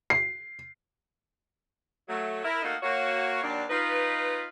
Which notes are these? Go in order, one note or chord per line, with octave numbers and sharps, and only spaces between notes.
C7
F#3 A3
E4 A#4
A3 A#3 D#4 F#4 A4 A#4
A#3 F#4 C#5
D#2 F#3 A#3 D4
D#4 F4 B4